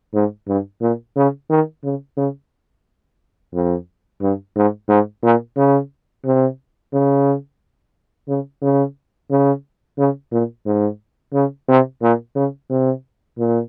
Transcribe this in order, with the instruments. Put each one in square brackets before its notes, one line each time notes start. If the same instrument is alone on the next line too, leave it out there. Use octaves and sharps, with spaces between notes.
[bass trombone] G#2
G2
A#2
C#3
D#3
C#3
C#3
F2
G2
G#2
G#2
A#2
C#3
C3
C#3
C#3
C#3
C#3
C#3
A#2
G#2
C#3
C3
A#2
C#3
C3
A#2